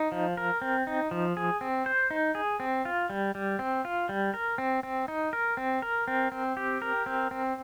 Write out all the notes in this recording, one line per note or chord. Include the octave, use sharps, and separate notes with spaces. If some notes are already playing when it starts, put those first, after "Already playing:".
Already playing: D#4
F3
A#4
C4
D#4
F3
G#4
C4
C5
D#4
G#4
C4
F4
G3
G3
C4
F4
G3
A#4
C4
C4
D#4
A#4
C4
A#4
C4
C4
G4
A#4
C4
C4